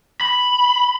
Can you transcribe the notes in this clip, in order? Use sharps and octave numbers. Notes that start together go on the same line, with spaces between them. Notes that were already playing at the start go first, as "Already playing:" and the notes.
B5